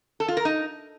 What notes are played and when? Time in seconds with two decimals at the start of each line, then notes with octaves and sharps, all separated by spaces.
0.20 A4
0.28 F4
0.37 A#4
0.45 D#4